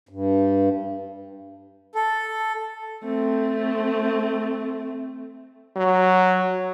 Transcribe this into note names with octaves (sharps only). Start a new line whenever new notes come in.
G2
A4
A3 C4
F#3